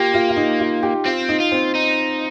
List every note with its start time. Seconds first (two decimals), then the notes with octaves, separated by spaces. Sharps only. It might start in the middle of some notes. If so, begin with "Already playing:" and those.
Already playing: A#3 F4 G4
0.14 F4
0.29 F4
0.36 D#4
0.60 F4
0.83 G4
1.05 C4 F4
1.29 D#4
1.40 F4
1.52 C4
1.75 D#4